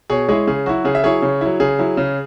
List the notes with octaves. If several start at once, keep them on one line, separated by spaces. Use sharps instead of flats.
B2 G#4 C#5
G#3 E4 G#4 C#5
C#3 G#4
F#3 E4 F#4
C#3 G#4
E5
F#3 E4 G#4 C#5
C#3
F#3 E4
C#3 G#4
F#3 E4
C#3